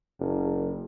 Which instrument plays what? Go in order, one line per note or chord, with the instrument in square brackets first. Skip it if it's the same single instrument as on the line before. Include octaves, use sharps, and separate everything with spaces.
[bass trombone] F#1